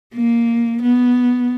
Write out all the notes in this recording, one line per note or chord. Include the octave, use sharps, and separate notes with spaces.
A#3
B3